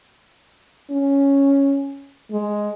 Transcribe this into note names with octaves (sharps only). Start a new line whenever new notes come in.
C#4
G#3